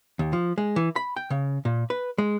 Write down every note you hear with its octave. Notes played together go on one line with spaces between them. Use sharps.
D#2
F3
G#3
E3
B5
G5
C#3
A#2
B4
G#3